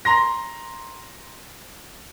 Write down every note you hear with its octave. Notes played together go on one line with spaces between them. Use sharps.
A#5 C6 A#6